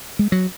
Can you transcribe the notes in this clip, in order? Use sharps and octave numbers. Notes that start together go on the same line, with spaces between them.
G#3
F#3